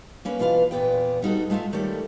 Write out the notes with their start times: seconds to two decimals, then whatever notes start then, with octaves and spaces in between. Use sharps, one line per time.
0.25 A#3 C#4 B4
0.39 B2 E3 F4 B4 F5
0.71 E2 A#2 B3 G5
1.22 G3 D#4 F#4 A4
1.50 G#3 A3 F4 D#5 E5
1.73 D#3 G3 A3 A4 C#5 D5